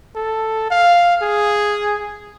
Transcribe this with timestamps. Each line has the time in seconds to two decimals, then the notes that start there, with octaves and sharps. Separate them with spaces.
0.15 A4
0.71 F5
1.22 G#4